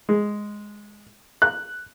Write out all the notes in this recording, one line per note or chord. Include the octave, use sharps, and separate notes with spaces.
G#3
F#6